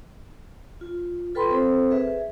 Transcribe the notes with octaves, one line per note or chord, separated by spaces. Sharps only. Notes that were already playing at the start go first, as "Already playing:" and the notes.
F4
F4 A4 B4 G5 B5 C6
C4 A4 C5
G#4 B4 E5